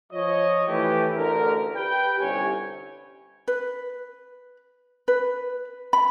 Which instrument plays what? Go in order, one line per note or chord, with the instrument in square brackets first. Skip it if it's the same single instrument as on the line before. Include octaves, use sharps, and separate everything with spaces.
[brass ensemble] F3 C#5 D#5
E3 A3 G4
A1 D2 D3 A#4
G4 B4 G5
G1 C2 C3 C#4 C#5 G#5
[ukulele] B4
B4
B5